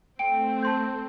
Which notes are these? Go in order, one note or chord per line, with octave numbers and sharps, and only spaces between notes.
A3 C4 G5 D7
A5 C6 G6